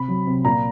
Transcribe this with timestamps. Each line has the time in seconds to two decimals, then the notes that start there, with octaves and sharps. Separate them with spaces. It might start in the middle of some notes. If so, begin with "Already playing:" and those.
Already playing: C3 B5
0.08 F#3
0.27 C3
0.45 A#2 A#5